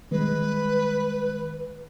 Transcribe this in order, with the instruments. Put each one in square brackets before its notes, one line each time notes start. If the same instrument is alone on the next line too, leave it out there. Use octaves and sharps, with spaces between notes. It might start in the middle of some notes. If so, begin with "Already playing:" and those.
[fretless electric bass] D#3 G3 G#3 [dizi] B4